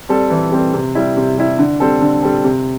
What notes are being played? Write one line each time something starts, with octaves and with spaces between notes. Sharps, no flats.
G3 C4 A4
E3
G3 C4 A4
C3
G3 E4
C3
G3 E4
D3
G3 C4 A4
D3
G3 C4 A4
C3